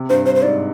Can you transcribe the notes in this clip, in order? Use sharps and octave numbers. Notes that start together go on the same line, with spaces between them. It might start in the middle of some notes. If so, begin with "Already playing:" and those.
Already playing: C3
G2 C5
G2 C5
C5
G#2 D5